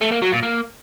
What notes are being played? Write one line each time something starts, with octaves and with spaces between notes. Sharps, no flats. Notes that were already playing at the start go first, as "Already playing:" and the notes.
A3
A#3
F#3
A#2
A#3